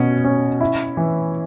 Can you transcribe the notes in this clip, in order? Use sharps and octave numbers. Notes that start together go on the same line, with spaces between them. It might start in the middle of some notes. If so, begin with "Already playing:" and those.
Already playing: B2 C#4
C#4
E4
E3